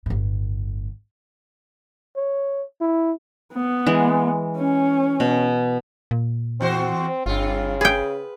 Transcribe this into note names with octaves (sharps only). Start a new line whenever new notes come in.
G1 A2
C#5
E4
B3
E3 G#3
C#4
B2
A#2
E2 C4 F#4 C5
G1 G2 C#3 F4
G#4 B4 G5